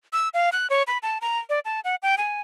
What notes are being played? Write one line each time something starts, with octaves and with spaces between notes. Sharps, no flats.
E6
F5
F#6
C#5
B5
A5
A#5
D5
A5
F#5
G5
G#5